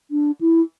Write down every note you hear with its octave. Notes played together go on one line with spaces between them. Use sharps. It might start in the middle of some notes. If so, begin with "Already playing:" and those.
D4
E4